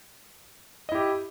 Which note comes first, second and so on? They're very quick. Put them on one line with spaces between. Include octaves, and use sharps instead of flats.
D#5 E4 G4